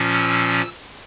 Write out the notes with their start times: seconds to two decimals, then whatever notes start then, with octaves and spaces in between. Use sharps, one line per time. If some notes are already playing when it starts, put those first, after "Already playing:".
Already playing: A#2 F3 C#4
0.14 E6